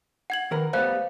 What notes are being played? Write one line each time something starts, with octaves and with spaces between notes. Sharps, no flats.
F#5 G#6 F#7
D#3 A#4 B4
G3 A3 B3 C5 F5 F#6